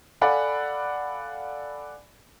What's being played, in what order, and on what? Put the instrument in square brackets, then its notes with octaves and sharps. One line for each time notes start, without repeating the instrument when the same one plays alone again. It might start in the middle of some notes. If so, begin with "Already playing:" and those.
[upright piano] A4 D5 F5 F#5 G#5 B5